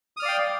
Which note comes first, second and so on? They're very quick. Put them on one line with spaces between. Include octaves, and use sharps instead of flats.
D#6 F6 D5 F5 G5